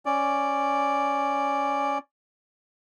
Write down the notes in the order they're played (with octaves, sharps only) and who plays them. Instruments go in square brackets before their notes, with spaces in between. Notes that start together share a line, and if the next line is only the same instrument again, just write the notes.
[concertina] C#4 D5